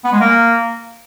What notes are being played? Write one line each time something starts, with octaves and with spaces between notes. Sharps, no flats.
B3
G#3
A#3